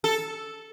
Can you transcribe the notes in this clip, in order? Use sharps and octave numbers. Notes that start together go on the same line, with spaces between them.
A4